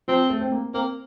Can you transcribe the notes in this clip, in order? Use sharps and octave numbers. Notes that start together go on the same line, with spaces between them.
F3 C4
A3
C4
A#3
A#3 C4